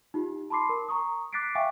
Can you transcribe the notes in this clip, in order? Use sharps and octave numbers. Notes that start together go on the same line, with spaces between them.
D#4 F4 G4
A5 B5 C6 D6 C7
A#4
A#5 C#6 D#6
D6 F#6 A6 B6 C7 D7
E5 F5 G5 G#5 C#6 D6